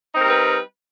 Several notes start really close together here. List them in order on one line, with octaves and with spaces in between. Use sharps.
D#4 C4 A#4 G3 B4